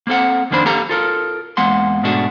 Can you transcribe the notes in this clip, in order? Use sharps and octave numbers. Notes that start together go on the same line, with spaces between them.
A#3 C4 A4 F#5
F2 D#3 A#3 D4 C5 B5
A#3 G4 A4 F5 A#5
F4 A4 A#4
E2 G#3 A#3 F#5 C6
G#2 B2 G#3 A3 D4 F#4